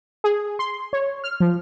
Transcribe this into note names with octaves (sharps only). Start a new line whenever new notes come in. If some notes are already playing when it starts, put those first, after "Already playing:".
G#4
C6
C#5
F6
F3